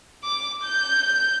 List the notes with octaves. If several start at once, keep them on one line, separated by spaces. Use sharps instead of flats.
D6
G6